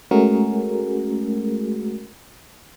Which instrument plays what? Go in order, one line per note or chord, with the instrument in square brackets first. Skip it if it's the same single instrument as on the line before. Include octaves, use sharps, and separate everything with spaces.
[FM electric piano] G#3 A3 C#4 F#4 G#4 A#4